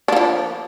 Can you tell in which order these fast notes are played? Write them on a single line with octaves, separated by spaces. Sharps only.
D4 A#3 F3